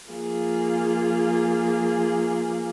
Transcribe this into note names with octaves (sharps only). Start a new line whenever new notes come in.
F3 A#3 F4 G#4